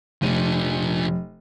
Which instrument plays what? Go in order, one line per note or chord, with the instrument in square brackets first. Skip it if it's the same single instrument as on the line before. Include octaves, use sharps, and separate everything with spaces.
[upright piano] F1 D#7 [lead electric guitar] F3 D4